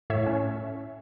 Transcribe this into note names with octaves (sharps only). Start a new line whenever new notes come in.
A2 C#5 E5
C#4